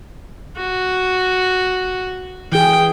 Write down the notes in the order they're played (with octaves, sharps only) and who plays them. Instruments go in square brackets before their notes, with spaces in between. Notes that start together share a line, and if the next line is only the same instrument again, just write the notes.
[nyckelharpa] F#4
[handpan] E3 G#4 [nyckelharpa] G5